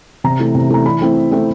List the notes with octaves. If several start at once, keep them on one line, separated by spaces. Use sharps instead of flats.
C3 A#5
E3 A3
C3
E3 A3 A#5
E3 B5
A3 C4 E4
E3
A3 C4 E4